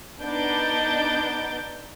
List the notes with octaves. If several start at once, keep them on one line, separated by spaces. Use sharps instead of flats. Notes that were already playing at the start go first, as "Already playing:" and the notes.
B3 D4 D#4 G6 A6 D7